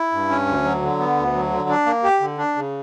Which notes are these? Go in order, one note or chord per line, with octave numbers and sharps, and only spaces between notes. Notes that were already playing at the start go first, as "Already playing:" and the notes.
Already playing: E4
G2
C#4
D2
F#3
D3
B3
D2
F#3
D3
D4
A#3
G4
D3
D4
C#3